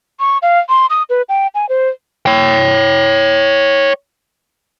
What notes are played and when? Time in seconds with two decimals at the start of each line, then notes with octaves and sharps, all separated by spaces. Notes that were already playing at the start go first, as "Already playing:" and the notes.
0.20 C#6
0.42 F5
0.69 C6
0.90 D#6
1.10 B4
1.29 G5
1.55 G#5
1.69 C5
2.26 C#5 G5